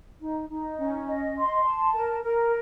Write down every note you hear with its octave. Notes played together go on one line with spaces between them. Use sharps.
D#4
D#4
C#4
D#5
C6
A5
A#4
A#4